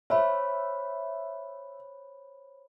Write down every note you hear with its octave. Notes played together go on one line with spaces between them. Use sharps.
C5 C#5 E5 B5